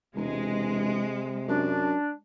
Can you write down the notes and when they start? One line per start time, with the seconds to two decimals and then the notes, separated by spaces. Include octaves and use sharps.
0.16 E1 C3 G#3
1.48 F#2 D4